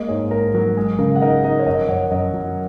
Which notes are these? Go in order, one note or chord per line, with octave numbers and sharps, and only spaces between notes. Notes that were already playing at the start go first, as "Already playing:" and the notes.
Already playing: G#3 A#3 A#4 D#5
G#2 G#4 C#5
G#2 A#4
F#3 A#4
G#3 G#4
C#3 A#4
F#5
D#4 A#4 D#5
D#4 A#4 D#5
C#5
F#2 A#4 D#5
F#2 C#5 F#5
F#2 A#4 D#5
F#3